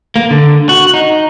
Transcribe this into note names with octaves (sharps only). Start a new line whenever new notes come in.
A#3
D3
F#4
D#4